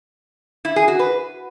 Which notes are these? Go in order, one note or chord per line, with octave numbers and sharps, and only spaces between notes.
E4
G#4
F#4
B4